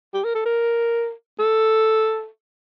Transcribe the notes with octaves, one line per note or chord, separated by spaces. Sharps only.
G4
A#4
A4
A#4
A4